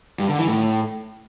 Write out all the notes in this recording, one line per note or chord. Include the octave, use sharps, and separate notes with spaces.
G2
D3
E3
A2